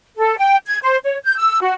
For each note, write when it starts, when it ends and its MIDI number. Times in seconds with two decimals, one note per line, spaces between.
0.16 0.36 69
0.38 0.56 79
0.66 0.77 92
0.84 0.98 72
1.03 1.17 73
1.23 1.36 91
1.37 1.59 88
1.62 1.73 66